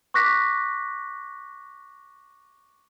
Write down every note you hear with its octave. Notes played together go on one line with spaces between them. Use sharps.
C#6 D6 F#6 A#6 B6